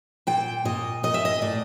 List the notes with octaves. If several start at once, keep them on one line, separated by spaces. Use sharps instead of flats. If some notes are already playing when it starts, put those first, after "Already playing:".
A#2 G5
A#2 D#5
A#2 D#5
E5
D#5
A2 D5